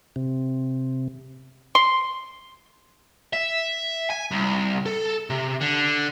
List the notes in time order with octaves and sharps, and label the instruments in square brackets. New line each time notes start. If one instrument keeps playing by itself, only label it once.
[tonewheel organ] C3
[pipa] C6
[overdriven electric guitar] E5
G#5
C2
A4
C3
D3